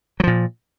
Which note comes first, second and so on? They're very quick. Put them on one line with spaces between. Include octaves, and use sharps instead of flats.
F#3 F3 A#2